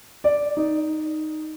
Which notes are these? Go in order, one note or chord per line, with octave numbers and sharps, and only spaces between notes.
D5
D#4